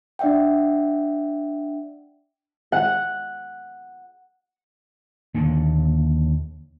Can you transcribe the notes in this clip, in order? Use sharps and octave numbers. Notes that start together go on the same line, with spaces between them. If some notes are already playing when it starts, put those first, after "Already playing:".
D4 D5 E5 F#5 G5
F#5
D#2 A#2 D3